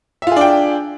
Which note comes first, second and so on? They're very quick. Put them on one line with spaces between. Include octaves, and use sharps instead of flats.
E5 F4 G#4 D4 G5